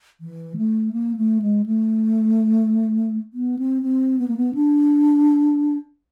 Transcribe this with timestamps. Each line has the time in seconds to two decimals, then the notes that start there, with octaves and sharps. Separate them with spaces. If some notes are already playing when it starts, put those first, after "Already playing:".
0.21 E3
0.57 A3
0.93 A#3
1.17 A3
1.42 G#3
1.66 A3
3.34 B3
3.59 C4
3.83 C4
4.19 B3
4.28 A#3
4.37 B3
4.55 D4